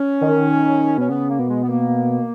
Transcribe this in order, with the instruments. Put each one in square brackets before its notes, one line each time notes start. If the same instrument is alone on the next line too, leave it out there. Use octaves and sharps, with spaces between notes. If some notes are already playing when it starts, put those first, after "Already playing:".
Already playing: [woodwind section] C#4
[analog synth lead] D#3
[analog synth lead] B2 [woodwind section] C#4
[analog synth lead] C#3 [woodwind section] B3
[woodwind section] A#3
[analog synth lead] B2
[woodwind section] G#3
B3
A#3